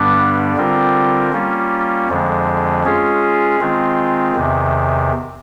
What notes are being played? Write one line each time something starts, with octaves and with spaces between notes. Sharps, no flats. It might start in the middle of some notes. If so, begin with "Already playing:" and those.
Already playing: G2 D3 G3 B3 D4
D3 G3 C4 F4 A#4
G3 A#3 C#4 F4
F2 D3 F3 G#3
G#3 C#4 F4 G#4
D#3 G#3 C4 F4
E2 C3 D#3